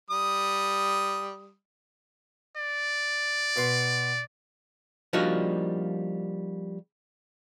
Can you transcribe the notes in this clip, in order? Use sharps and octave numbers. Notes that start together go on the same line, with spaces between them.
G3 D#6
D5
B2 B4 C6
F3 G3 A#3 D4 D#4 F#4